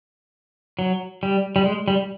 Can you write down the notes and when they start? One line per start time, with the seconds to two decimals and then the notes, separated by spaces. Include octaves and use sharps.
0.79 F#3
1.23 G3
1.56 G3
1.66 G#3
1.88 G3